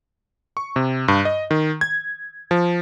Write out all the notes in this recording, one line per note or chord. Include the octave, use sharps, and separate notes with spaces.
C#6
C3
G2
D#5
D#3
G#6
F3